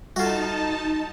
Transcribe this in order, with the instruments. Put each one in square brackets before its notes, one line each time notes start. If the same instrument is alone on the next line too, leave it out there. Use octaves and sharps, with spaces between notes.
[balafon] G3 A4 [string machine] D#4 A5 [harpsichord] F4 F#4